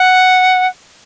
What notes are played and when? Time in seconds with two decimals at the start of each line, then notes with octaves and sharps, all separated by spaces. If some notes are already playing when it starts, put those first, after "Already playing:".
Already playing: F#5